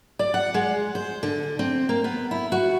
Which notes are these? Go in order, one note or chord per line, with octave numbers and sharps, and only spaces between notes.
D5
F#5
G#3
C5
D3
C4
A#3
B3
E4
F#4